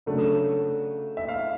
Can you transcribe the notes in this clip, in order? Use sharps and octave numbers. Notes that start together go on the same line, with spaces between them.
C#3 F#3 A3 D4
E5
F5